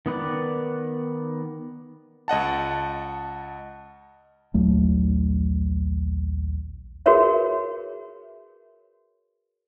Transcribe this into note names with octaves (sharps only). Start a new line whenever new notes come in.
D#3 B3 B4 D5
C#2 D#5 F#5 A5
A#1 D#2 F#3 A3
F#4 G#4 A#4 B4 C#5 E5